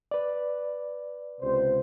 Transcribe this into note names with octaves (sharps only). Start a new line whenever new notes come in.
B4 D5
C#2 C3 C5